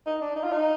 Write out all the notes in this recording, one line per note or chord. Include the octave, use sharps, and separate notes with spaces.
D#4
D4
D#4
F4
D#4